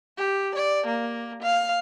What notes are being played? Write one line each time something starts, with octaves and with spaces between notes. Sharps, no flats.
G4
D5
A#3
F5